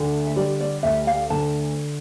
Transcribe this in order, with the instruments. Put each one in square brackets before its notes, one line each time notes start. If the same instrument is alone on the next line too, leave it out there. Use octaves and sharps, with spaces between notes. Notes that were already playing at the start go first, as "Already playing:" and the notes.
Already playing: [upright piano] D2 D3
[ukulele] E5
[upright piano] G3 [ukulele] D5
[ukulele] D5
[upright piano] D2 [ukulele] E5
[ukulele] F5
[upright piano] D3 [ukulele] A5